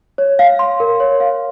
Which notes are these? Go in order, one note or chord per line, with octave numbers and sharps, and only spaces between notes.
C#5
F5
C6
A#4
C#5
F5